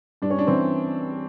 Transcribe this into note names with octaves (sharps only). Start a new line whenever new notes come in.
G2 D4
C#4
D4
E3 C4